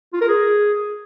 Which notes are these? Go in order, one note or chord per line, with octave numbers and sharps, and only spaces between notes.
F4
A#4
G#4